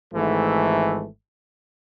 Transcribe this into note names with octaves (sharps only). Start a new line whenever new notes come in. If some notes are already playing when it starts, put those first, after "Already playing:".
G#1 G#2 E3 A3